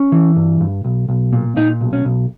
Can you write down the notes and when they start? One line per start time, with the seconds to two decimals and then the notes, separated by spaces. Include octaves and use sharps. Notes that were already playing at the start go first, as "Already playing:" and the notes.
Already playing: C#4
0.12 E3
0.36 G2
0.61 G2
0.84 B1
1.09 B1
1.33 A#2
1.57 A#2 D#4
1.81 B1
1.93 C#4
2.05 B1